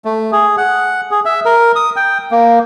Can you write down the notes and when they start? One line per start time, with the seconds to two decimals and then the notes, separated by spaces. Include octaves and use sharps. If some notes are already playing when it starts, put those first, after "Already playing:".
0.05 A3
0.32 G#4
0.58 F#5
1.11 G#4
1.25 E5
1.45 A#4
1.76 D#6
1.96 G5
2.31 A#3